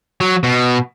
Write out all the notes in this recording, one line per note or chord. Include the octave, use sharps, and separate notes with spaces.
F#3
B2